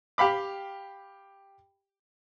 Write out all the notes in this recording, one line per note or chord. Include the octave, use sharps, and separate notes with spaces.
G4 F5 B5 D6